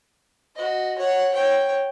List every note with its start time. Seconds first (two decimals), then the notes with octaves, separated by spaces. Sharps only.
0.55 F#4 D#5
0.98 C#5 F#5
1.33 C#5 G5